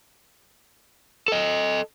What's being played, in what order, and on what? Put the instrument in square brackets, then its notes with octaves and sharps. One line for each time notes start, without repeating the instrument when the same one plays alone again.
[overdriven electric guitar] A4 D#5